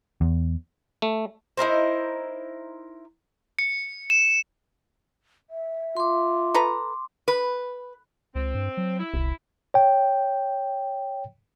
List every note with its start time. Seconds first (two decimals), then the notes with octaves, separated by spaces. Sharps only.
0.21 E2
1.02 A3
1.57 D#4 E4 A#4 C5
3.59 C#7
4.10 E7
5.50 E5
5.97 F4 C6 D6
6.54 A4 B4 A#5
7.28 B4
8.35 C#2 C4
8.54 G2
8.77 F#3
8.99 E4
9.14 D#1 C2
9.74 C#5 G5